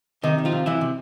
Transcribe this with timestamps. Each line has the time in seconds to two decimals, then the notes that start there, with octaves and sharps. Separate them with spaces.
0.23 C3 D#3 D#4
0.38 D#3
0.45 F3 F4
0.52 C3
0.66 C3 E3 E4
0.81 C3